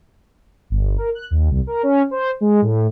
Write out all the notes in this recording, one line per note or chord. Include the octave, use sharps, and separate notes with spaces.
G1
A#4
F#6
D#2
C2
A#4
C#4
C5
G#3
A2